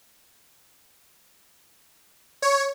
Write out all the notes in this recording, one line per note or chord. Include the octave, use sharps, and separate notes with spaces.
C#5